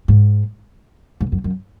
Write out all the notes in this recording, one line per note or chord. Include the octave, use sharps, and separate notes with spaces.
G#2
G#2
F#2
F#2